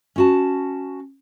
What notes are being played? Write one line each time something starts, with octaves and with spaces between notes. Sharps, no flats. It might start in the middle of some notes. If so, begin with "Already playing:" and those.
C#4 F#4 A5